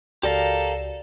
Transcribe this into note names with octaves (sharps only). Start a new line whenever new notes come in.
C#2 F#4 G4 A4 A#4 D5 F5